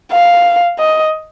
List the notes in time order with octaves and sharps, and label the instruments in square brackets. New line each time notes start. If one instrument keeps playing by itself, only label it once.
[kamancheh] F5
D#5